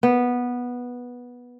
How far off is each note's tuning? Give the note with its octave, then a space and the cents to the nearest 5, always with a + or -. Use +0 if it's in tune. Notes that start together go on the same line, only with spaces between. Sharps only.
B3 -10